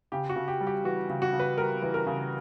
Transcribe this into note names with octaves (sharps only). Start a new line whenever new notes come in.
C#3 G4
F#4
C#3
G4
G3
G4
E3 F#4
C#3
F#4
C#3
B4
G3 A#4
E3
A#4
C#3